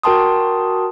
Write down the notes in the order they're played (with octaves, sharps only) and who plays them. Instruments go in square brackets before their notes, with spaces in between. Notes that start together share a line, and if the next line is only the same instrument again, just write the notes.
[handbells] F#4 A#4 G5 A5 C6 D#6